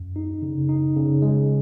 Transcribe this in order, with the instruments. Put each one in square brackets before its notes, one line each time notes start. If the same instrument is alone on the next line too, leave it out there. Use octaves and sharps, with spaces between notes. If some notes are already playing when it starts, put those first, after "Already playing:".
Already playing: [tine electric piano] F#2
D#4
C#3
D#4
C#3
G#3